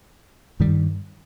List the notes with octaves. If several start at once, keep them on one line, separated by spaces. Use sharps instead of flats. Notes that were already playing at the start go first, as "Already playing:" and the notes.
G2 D#3 G3